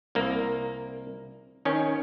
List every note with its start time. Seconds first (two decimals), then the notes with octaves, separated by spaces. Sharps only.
0.15 C2 A#3
1.65 D#3 C#4